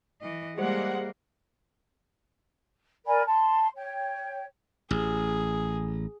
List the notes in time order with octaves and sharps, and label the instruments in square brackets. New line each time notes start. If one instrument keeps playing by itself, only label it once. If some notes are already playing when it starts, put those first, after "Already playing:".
[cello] E3 D#5
[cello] G3 A#3 [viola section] G#3 F#5 [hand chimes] G4 G#4 C5
[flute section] A#4 D5 G#5 B5
A5 C6
C#5 G5
[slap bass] A1 [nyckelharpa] G#4